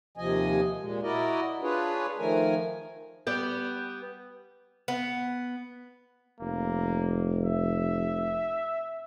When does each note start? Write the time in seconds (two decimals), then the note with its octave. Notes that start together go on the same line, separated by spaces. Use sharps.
0.17 D#2 C3 F3 D#5 G#5
0.80 A#2 G#3
1.03 E4 F#4 A#4 D5 D#5
1.62 D4 F4 G#4 B4 C#5
2.18 D#3 F3 A3 A#4 G#5
3.27 G3 B3 G5
4.88 B3
6.40 F1 A#3
7.44 E5